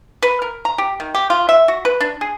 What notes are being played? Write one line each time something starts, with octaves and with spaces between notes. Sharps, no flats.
B4
A#4
A#5
G4
D#3
G4
F4
E5
F#4
B4
D4
G#4